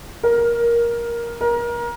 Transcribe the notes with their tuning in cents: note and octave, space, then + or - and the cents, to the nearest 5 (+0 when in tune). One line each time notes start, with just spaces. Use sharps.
A#4 +10
A#4 +25